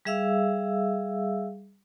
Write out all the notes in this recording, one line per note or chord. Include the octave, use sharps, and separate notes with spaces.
G3 G#4 E5 F5 E6